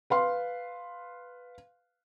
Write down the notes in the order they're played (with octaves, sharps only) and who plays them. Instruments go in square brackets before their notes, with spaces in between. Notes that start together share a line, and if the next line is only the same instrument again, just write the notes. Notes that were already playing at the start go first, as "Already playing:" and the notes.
[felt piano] B4 F5 C6